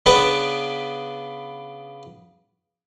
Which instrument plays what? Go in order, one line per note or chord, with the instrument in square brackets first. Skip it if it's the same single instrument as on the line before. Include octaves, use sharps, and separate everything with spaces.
[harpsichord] C#3 B3 D4 B4 A5 B5